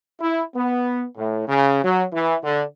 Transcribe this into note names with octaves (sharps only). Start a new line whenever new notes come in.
E4
B3
A2
C#3
F#3
E3
D3